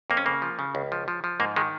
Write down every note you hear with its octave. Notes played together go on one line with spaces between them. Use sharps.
F2 A#3
C#4
C#3 A#3
F3
C#3
C#2
F3
F3
F3
G#2 A#3
D#3 G#3